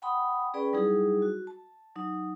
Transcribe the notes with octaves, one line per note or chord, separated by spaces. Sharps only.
F#5 G5 A5 B5 C6 D#6
C#4 G#4 B4 D5 G5 B5
F#3 G3 D#4 E4 G#4
F#4
A5
F#3 D#4